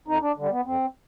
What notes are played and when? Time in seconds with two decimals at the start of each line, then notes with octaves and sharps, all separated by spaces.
0.07 F2 D#4
0.22 D4
0.37 D3 G3
0.51 B3
0.66 F2 C4